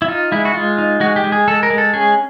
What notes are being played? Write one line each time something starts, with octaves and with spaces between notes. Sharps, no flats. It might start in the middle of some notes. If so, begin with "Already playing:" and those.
E4
D#4 F4
G#3 E4
F#4
G#3 F4
D#4
G#3 F#4
G4
G#3
G#4
G#3 A4
A#4
G#3
A4
C#4 G#4